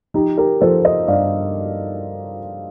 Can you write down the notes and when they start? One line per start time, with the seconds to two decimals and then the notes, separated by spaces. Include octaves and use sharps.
0.14 F3 D#4 G4
0.38 G4 A#4
0.61 F3 A4 C5
0.85 C5 D#5
1.08 G2 D5 F5